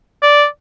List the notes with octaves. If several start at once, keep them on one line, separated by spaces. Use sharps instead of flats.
D5